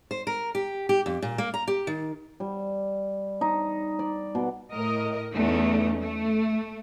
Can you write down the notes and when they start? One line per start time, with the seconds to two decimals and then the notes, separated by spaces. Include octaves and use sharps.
0.11 C5
0.27 A#4
0.55 G4
0.89 G4
1.06 F2
1.22 A#2
1.38 A#3
1.54 A#5
1.68 G4
1.87 D#3
2.40 G3
3.41 D#4
3.99 D5
4.35 B2
4.73 A2 A#4 D#5
5.34 E2 A3 C#4 D#4
6.00 A3